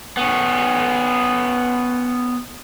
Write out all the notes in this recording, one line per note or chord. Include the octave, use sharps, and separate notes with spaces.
B3 C#4